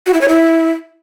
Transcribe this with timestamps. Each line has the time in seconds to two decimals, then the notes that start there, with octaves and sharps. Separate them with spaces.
0.06 F#4
0.14 E4
0.21 C#5
0.28 E4